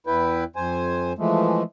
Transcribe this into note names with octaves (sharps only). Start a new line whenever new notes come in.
E2 E4 B4 G5
F2 C5 G#5
E3 F3 G#3 A3